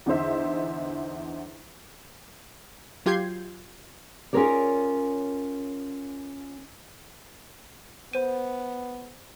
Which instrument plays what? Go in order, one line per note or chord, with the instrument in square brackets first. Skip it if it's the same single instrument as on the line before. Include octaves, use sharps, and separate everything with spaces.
[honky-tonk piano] E2 D3 D#4 C5 E5
[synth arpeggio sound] F#3 F4 G4 G6 G#6 C7
[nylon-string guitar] C#4 F4 G#4 A#4 C#5 D5
[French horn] B3 [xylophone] C5 D#7